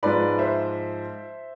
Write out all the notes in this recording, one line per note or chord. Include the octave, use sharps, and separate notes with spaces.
G#2 F3 B4 D5
C5 E5